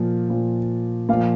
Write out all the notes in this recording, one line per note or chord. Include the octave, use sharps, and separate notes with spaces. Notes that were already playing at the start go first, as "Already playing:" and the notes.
Already playing: A#2 F3
A#2 F3
A#2 F3 F5